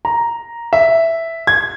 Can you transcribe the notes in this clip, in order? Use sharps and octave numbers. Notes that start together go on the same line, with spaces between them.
A#5
E5
G#6